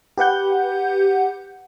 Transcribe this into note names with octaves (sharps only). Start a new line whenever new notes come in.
G4 B4 F#5 G6